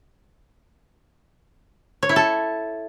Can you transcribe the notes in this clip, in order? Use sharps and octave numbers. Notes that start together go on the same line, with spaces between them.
C#5
E4
A4